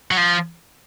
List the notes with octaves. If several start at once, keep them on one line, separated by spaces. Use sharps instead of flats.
F#3
F3